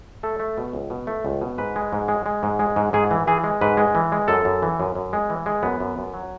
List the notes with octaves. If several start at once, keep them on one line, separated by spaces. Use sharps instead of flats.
A3 A4
A3
B2
C#2
B2
A3
C#2
B2
G#2 B4
G#3
G#2
G#3
G#3
G#2
G#3
G#2
G#2 G#4
E3
E3 G#4
G#3
G#2 B4
G#3
E3
G#3
F#2 A4
F#2
E3
F#2
F#2
G#3
E3
G#3
F#2 B3
F#2
F#2
F#3